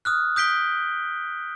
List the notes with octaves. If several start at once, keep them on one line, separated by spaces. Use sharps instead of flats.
D#6 F6 F#6
D#6 G6 B6 D7 G7